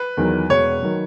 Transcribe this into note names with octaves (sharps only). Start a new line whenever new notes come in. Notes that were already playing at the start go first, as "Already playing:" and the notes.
Already playing: B4
E2 D#3 F#3
E1 C#5
D#3 F#3